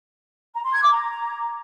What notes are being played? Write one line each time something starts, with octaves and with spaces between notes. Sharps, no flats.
A#5
C6
G#6
D6
A#5